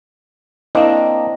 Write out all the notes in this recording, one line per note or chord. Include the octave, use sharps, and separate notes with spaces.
A#3 C4 D4 E4 D#5 F5